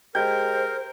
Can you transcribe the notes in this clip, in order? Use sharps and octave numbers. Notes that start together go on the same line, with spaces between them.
G#3 G4 A#4 C5 G6